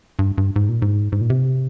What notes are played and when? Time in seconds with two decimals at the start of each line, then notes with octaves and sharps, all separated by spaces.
0.19 G2
0.38 G2
0.56 G#2
0.69 A#2
0.82 G#2
1.12 G#2
1.21 A#2
1.30 C3